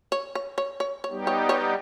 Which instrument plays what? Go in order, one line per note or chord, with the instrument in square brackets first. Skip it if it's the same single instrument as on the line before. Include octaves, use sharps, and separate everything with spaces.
[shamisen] C#5
C#5
C#5
C#5
C#5
[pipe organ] G3 B3 D#4 G4
[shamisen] C#5
C#5